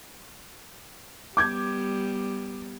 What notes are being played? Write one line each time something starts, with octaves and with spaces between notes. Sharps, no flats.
G3 B3 D6 G6 G#6